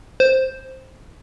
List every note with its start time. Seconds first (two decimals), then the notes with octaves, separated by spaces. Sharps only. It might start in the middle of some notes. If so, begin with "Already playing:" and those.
0.20 C5